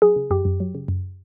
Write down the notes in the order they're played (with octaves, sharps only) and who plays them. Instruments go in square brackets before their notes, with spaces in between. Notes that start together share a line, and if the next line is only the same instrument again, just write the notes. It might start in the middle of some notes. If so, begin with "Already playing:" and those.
[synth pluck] F#3 G#4
C#3
F#2 G4
F#2
F#3
C#3
F#2